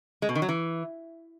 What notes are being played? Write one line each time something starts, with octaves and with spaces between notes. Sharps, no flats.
G#3
B2
D#3
F#3
E3